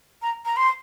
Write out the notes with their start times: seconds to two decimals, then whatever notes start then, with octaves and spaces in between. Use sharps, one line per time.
0.21 A#5
0.45 A#5
0.56 C6